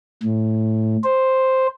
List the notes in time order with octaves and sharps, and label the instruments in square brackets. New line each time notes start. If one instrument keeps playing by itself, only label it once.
[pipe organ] A2
C5